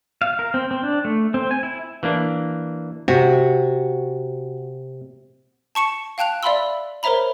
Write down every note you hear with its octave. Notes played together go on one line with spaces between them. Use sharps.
F5
A#4
C4
C4
D4
A3
C4
G#5
E4
E3 A#3 D4
C3 F#4
A5 C#6 C#7 E7
F5 G5 A5 F#6 F7
D5 E5 F5 B5 C6 E6
A#4 C5 C#5 E5 A#5 B5